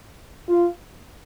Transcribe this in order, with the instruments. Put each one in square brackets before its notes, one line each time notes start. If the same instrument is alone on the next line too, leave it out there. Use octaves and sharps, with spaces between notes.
[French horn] F4